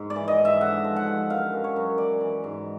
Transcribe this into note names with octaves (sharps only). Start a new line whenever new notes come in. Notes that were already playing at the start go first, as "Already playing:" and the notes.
Already playing: G#2
D5
E3
D#5
G#2
E5
D3 F#5
F3
F#5
G2
F#2 F5
F#2
C#5
F#2
E3 D5
E3
G#2